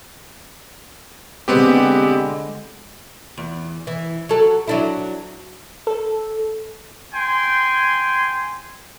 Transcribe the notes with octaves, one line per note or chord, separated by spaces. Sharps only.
D3 G#3 B3 C4 G4
E2
E3
F#3 A4
F#3 D4 E4
A4
G5 G#5 C6